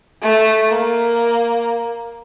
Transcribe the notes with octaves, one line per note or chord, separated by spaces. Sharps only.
A3
A#3